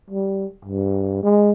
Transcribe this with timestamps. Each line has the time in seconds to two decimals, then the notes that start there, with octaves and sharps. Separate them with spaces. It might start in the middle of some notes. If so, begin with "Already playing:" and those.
0.10 G3
0.65 G2
1.23 G#3